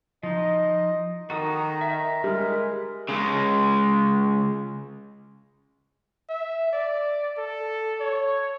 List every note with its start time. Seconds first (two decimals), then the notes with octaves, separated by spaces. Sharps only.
0.23 F3 D#4 D#5
1.30 D#3 F#4 A4 A#5 D#6
1.81 E5
2.24 G3 G#3 A#4
3.09 C#3 G#3
6.29 E5
6.73 D5
7.37 A4
8.00 C#5